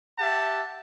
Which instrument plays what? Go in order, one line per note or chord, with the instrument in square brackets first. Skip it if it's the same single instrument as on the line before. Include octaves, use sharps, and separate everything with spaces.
[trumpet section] G4 E5 F#5 A5